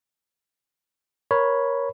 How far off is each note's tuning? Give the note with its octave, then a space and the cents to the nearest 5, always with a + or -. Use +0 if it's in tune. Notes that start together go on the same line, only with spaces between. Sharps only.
A#4 +20 C#5 +0 B5 +0